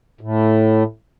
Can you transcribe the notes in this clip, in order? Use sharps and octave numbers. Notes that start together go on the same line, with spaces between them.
A2